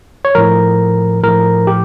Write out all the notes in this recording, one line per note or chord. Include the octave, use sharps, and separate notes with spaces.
C#5
A2 F3 A#4
A2 F3 A#4
G4